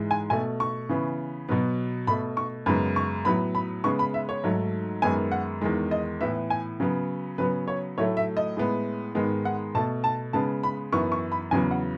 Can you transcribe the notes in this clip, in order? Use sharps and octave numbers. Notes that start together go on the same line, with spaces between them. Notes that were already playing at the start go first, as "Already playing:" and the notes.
Already playing: G#2 E3 G#3
G#5
B2 A3 G#5
C#6
C#3 E3 B3
B2 F#3 B3
B2 A3 B5
C#6
F#2 C#3 G#3 B3 B5
C#6
A2 F#3 B3 B5
B5
C#3 G#3 B3 C#6
B5
E5
C#5
G#2 F#3 A3
F#2 D#3 G#3 B3 G#5
F#5
E2 D#3 G#3
D#5
A2 E3 B3 E5
G#5
C#3 F#3 B3
C#3 F#3 B3 B4
C#5
A2 F#3 A3 C#5
E5
D#5
A2 G#3 B3
G#2 D#3 G#3 B3
F#5
B2 A3 A5
A5
C#3 G#3 B3 A5
B5
F#2 E3 B3 C#6
C#6
B5
E2 C#3 F#3 B3 G#5
F#5